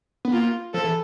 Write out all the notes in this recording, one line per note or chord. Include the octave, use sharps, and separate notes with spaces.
B3
A#3 F4
F3 A4
E3